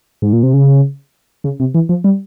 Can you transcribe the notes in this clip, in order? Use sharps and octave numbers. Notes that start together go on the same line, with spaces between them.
G#2
A#2
C3
C#3
C#3
C3
E3
F3
G3